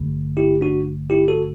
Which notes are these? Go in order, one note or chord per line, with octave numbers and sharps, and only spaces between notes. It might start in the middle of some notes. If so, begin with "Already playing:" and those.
Already playing: A1 G2 D3 A3
E4 G4
D4 F#4
E4 G4
F#4 A4